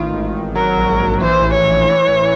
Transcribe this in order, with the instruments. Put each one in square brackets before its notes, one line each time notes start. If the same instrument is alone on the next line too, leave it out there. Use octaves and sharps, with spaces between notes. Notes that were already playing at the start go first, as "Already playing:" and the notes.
Already playing: [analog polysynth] A1 D#3 [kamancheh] F4
[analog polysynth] G#1
G#1
[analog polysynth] F#3 [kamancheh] A#4
[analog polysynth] A#1
A#1
[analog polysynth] E3 [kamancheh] C5
[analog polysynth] A1
[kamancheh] C#5
[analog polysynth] A1
E3
A1